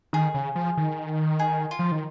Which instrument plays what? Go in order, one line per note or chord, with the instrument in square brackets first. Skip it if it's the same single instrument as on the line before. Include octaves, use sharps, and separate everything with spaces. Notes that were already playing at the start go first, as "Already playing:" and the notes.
[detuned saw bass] D#3 [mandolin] G#4
[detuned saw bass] C#3
F3
D#3
[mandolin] G#4
F4
[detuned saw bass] F3
D#3